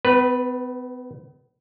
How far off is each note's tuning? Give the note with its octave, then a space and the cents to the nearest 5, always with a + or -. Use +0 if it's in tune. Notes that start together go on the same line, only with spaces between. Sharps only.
B3 +40 B4 -5